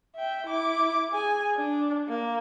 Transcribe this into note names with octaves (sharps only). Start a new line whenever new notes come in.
E5 G5
E4 D6
G#4 G#5
D4
A#3